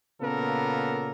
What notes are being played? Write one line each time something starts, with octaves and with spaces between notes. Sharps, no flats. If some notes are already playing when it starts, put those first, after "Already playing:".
A#2 C#3 A#3 B3 A4 A#4